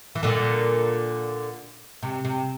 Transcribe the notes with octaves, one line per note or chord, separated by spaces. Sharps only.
E3
A#2 D3
C3
C3